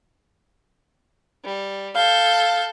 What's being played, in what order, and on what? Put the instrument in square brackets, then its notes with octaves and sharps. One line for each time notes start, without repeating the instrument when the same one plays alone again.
[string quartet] G3
[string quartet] A4 G6 [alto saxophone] F5